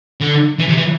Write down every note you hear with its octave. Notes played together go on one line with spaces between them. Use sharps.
D3
E3
C3
E3